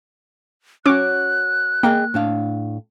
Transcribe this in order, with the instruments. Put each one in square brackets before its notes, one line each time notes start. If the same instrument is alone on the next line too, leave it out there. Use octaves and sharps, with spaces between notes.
[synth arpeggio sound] C#4 D6 [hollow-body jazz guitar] F#4 C#5 [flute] F#6
[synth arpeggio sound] A#3 [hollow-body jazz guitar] G#4 D#5 G5
[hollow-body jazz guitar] A2 D4 F5